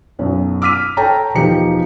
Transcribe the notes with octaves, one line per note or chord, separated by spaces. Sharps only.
B1 F#2
D6 E6 F6 B6 D#7
A4 C#5 G5 A5 A#5
E1 F3 B3 D#4 G4 C#7